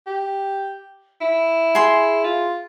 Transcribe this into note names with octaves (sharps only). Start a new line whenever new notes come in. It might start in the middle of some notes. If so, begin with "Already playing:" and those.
G4
E4
G#4 C6
F4